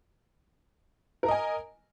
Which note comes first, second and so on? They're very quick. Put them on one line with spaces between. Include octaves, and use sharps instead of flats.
A#4 A#5 D#5 G#5